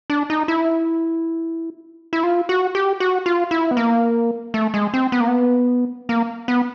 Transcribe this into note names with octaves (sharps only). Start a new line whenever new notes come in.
D4
D#4
E4
E4
F4
F#4
G4
F#4
F4
E4
B3
A#3
A3
G#3
C4
B3
A#3
B3
A#3
B3